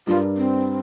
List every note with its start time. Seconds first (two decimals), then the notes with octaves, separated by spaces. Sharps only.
0.07 G2 G3 D4 F4 A#4
0.37 C4